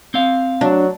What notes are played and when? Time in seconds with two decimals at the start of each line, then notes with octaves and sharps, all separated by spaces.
0.14 C4 F5
0.61 F#3 D4